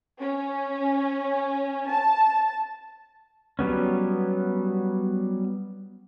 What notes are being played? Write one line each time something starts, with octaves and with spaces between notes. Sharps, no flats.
C#4
A5
F#3 G3 B3 C#4